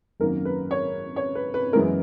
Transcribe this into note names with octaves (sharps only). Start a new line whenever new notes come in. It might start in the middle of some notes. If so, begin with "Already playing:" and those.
G#1 F#2 D#3 F#3 A#3 A#4
B4
C#5
C#5
B4
B4
F#2 E3 G#3 B3 A#4